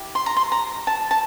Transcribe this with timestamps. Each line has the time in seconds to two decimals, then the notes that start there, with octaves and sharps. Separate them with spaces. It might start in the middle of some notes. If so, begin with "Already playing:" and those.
Already playing: E4 G4
0.15 C6
0.26 A#5
0.37 C6
0.52 A#5
0.87 A5
1.11 A5